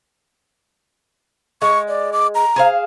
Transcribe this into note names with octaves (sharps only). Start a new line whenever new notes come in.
G#3 C#6
D5
D6
A#5
G#4 C5 F5